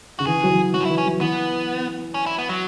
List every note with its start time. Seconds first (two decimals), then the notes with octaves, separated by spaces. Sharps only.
0.19 C#3 F#4
0.27 E3 G#4
0.43 F#3
0.50 E3
0.74 F#3 F#4
0.81 C#4
0.85 E4
0.90 E3
0.98 C#4
1.06 F#3
1.21 E3 B3
2.14 C#4
2.26 E4
2.39 B3
2.49 F#3